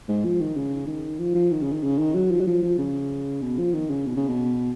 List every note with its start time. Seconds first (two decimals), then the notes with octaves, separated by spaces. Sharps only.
0.08 G#2
0.24 F3
0.40 D#3
0.56 C#3
0.87 D#3
1.19 F3
1.35 F3
1.51 D#3
1.62 C#3
1.73 D#3
1.83 C#3
1.99 D#3
2.15 F#3
2.32 F3
2.40 F#3
2.47 F3
2.63 F3
2.78 C#3
3.42 B2
3.59 F3
3.73 D#3
3.90 C#3
4.06 B2
4.17 C#3
4.28 B2